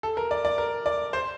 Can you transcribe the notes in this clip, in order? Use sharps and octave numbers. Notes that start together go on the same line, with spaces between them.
A4
A#4
D5
D5
A#4
D5
C5